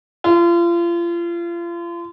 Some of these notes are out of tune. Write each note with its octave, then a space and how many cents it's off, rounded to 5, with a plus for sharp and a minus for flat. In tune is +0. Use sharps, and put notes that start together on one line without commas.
F4 -35